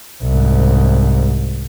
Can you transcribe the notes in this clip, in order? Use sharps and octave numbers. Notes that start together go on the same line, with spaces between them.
C2 G#2